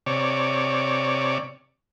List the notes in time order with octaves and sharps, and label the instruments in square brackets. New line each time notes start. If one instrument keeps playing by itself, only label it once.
[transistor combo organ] C3 C#5 D5